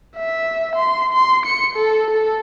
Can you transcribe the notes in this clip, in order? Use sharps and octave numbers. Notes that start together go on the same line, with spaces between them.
E5
C6
C6
C#7
A4
A4